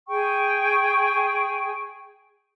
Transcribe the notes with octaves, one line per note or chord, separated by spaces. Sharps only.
G#4 G5 C#6